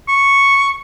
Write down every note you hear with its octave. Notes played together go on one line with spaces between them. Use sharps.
C#6